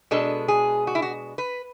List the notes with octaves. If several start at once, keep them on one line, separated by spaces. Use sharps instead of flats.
B2 G#3 D4 A4
G#4
F#4
E4
F#4
B4